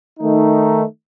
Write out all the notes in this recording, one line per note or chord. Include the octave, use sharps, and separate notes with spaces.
D#3 A3 D#4